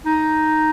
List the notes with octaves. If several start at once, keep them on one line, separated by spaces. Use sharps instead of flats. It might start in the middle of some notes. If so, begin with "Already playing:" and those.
D#4